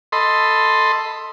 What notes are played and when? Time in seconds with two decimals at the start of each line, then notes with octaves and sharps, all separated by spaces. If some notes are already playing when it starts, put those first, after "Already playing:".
0.12 A4 D#5 B5 C6